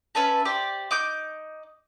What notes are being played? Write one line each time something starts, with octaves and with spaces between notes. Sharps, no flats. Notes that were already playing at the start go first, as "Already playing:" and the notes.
C#4 B4 E5 A5
G4 C5 D5
D#4 D6 G6